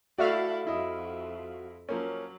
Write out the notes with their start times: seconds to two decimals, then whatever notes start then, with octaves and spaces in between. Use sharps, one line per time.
0.18 A3 E4 F#4 A4 D5 E5 F5
0.67 F2 E4 D#5
1.89 F3 F#3 A#3 C#4